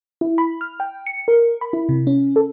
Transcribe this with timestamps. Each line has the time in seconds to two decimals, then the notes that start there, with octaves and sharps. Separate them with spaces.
0.21 E4
0.38 B5
0.61 F6
0.80 G5
1.06 C#7
1.28 A#4
1.61 B5
1.73 E4
1.89 C3
2.07 C#4
2.36 A4